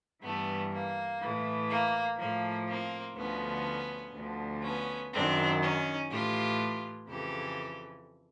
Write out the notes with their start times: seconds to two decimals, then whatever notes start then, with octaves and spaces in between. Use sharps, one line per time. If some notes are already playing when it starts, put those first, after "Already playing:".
0.23 G2 E3 A3 B3
0.73 A#3
1.22 A2 E3
1.70 A#3
2.19 A2 F3 A#3
2.68 A#3 C4
3.16 D2 D3 F3 B3 C#4
4.14 D2 D3 F3
4.63 B3 C#4
5.12 F#2 D#3 C4 D4
5.61 C#4 D#4
6.10 A2 E3 F4 G4
7.08 F2 C#3 E3 G4 A4